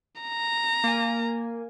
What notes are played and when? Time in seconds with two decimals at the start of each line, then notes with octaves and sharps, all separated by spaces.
0.21 A#5
0.84 A#3 G#5